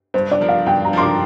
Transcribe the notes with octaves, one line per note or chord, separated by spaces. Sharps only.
G2 C5
D5
F3 D4 A#4
F5
G2 G5
A#5
F3 D4 A#4 C6
D6